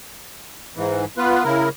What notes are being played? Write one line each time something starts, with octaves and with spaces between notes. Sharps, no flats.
G#2 E3
B3 F4 B4
C#3 E4 A#4